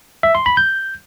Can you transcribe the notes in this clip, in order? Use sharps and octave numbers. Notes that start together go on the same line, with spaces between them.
E5
C6
B5
G6